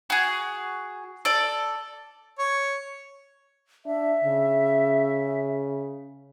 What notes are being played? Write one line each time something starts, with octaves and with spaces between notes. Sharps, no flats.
F#4 G#4
A4 D5
C#5
D4 E5
C#3